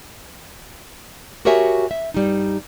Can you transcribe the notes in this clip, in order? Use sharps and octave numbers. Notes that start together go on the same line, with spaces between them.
F#4 G4 A#4 C#5 E5 G#5
E5
G2 G3 D#4